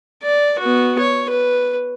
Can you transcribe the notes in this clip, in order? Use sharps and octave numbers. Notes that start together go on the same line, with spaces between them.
D5
B3 F#4
C#5
B4